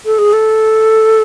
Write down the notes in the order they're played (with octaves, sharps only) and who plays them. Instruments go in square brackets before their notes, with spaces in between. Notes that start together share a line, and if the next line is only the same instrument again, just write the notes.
[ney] A4
G#4
A4